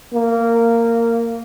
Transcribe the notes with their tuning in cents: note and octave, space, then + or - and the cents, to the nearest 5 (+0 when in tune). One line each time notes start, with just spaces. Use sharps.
A#3 -15